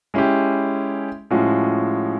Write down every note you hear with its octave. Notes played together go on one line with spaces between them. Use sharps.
G#3 C#4 E4 G4
A2 F3 G#3 C#4 F#4